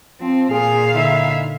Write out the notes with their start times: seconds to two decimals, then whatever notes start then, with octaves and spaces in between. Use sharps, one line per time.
0.21 F3 C4
0.51 A#2 G#4 F5
0.94 D3 D#4 E4 E5